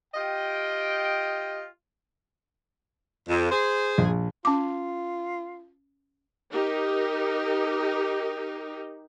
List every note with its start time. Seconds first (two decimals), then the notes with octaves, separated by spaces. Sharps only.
0.15 F4 G4 D#5 G5
3.29 F2
3.51 G#4 C5
3.98 A#1
4.45 C#4 F4 D6
6.51 D#4 G4 A#4